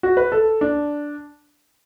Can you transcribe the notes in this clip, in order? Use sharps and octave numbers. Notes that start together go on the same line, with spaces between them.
F#4
B4
A4
D4